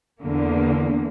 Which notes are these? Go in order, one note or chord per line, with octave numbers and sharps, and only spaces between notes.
E2 D3 A#3